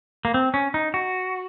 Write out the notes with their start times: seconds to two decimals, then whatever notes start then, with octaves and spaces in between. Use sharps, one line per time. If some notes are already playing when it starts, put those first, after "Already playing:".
0.25 A#3
0.34 C4
0.54 C#4
0.74 D#4
0.94 F#4